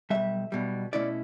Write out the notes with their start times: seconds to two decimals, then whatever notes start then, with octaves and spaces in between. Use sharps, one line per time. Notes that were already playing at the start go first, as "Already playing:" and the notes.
0.10 B1 B2 G3 E5
0.52 B1 B2 G3
0.93 B2 A3 C#4 E4 D5